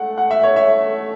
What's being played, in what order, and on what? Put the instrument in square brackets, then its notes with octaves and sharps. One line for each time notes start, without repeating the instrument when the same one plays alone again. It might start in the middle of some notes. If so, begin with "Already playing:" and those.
Already playing: [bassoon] A3 [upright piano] F#5
[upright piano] F#5
E5
C#5
E5